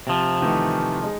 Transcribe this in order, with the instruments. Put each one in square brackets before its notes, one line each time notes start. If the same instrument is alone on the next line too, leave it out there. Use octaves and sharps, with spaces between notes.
[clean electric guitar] C3 F3
[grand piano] D#3 E3 A3
G#3 D#4